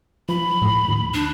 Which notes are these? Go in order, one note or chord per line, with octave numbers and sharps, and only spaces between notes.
F3 B5
A2
D#2
D4